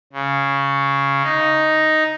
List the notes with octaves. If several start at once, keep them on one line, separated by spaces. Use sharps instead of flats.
C#3
D#4